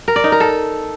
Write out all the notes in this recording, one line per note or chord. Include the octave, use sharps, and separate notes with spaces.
A#4
D5
D#4
A#4
A4